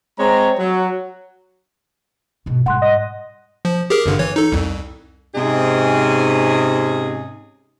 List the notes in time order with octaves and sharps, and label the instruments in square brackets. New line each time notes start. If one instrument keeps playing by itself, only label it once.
[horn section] G#3 C4 C#5 A#5
F#3
[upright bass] G#2 B2
[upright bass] G#2 G3 [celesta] F#5 C6 F#6
[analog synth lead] D#5
[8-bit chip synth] F3
G4 G#4 A#4
G#1 G2 D3
E3 C#5
D#4 A4
C2 F2
[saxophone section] G#2 C3 C#4 D#4 G#4